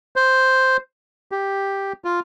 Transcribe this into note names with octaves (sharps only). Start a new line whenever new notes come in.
C5
G4
F4